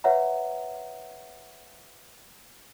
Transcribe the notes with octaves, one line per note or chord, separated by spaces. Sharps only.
B4 C#5 E5 F#5 A#5